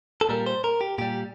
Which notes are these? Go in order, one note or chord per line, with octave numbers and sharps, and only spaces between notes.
A4
A#2 G3 A#4
C5
A#4
G4
A#2 G3 G4